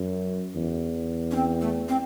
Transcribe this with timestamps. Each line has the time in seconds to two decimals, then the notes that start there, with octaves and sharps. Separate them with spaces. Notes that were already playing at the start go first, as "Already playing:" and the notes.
Already playing: F#2
0.55 E2
1.31 C#4
1.36 C4
1.61 A3
1.89 C4